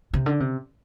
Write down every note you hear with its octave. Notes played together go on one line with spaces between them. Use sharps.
C3
D3
C3